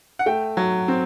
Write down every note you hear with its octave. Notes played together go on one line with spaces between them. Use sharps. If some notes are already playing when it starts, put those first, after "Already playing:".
F#5
A3 G5
F#3
C4